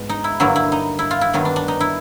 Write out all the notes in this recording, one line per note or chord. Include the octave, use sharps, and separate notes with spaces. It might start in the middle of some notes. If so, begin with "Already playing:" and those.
Already playing: G#2 G#3 B3
D#4
E4
G2 D3 F#3 A#3 E4
E4
D#4
E4
F4
E4
G2 D#3 F#3 B3
D4
D4
D#4
E4